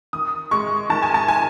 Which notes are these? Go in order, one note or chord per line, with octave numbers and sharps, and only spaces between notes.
D#3 D#6
G#3 C#6
D#3 A5
G#5
A5
G#5